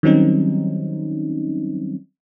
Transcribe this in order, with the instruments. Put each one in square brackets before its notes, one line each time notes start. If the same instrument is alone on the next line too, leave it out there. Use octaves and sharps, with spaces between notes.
[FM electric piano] D#3 F#3 G3 C4 C#4 D#4